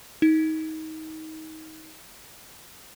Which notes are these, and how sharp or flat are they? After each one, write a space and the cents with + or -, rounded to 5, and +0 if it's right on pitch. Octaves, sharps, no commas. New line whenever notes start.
D#4 +25